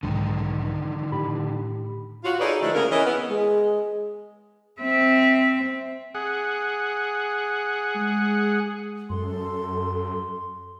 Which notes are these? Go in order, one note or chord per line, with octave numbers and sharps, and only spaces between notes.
B1 G#2 D3 D#3
A2 G4 B5
F4 F#4
D#4 G#4 A4 B4 C#5 D5
D3 F3 G#3 A3 D#4 E4
C#3 G#3 A#3 B3 A#4
E3 C#4 D#5
B3
G#3
C4 E5
G#4 F#5
G#3
F#2 A4 C6